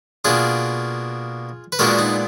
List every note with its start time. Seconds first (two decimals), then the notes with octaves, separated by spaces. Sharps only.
0.25 B2 A#3 D4 F4 G#4
1.72 B4
1.79 A#2 G#3 B3 D4 F#4 A#4
1.99 D#4